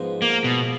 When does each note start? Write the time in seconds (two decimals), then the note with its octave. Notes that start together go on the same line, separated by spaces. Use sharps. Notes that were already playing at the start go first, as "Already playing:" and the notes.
Already playing: G#2 F3 G#3 B3
0.22 A#3
0.44 B2